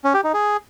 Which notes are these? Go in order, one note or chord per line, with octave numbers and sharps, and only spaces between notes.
C#4
G4
D#4
G#4